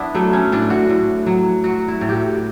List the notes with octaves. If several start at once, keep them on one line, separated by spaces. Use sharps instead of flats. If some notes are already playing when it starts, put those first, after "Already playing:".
Already playing: B3 D4 E4
F#3 A3
C#4
A2 D4
F#4
A2
F#3
F#3 F#4
E4
A2
F#4 G4